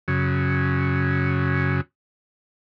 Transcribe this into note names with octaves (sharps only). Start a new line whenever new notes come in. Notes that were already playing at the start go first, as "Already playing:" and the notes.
F#2 C#3